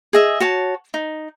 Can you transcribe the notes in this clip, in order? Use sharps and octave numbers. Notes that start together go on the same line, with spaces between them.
G#4 D#5 E5
F#4 C#5 A5
D#4